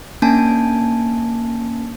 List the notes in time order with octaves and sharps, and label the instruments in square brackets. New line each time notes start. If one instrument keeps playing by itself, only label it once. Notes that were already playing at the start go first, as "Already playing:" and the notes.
[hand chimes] A#3 C#4 D4 G#5 A5